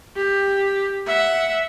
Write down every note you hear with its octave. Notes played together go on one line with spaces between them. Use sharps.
G4
E5 F#5